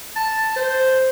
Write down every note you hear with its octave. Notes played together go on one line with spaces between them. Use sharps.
A5
C5